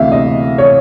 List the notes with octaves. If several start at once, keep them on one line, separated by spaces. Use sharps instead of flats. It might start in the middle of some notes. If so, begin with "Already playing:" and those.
Already playing: D2 C3 E3 E5 F5
D#5
C#5